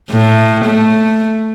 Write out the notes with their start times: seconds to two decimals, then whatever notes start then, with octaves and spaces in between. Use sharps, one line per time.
0.11 A2
0.64 A3